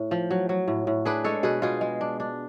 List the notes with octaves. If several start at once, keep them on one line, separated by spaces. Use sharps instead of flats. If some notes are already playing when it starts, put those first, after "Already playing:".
Already playing: A2
F3
F#3
F#3
A2
A2
D4 G#4 B4
G#3 A4 C#5
B2 G#4 B4
B2 F4 G#4
G#3
D4
D4